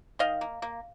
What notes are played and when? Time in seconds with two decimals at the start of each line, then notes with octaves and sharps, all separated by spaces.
0.19 D#3 D#5 F5
0.41 A#3
0.62 A#3